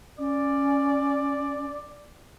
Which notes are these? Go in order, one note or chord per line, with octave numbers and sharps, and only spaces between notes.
C#4 D5